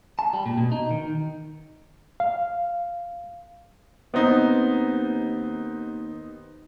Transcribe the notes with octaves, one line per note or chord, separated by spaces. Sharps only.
A5
G3
A#2
B2
D#4
D#3
F5
D#2 B3 C4 D#4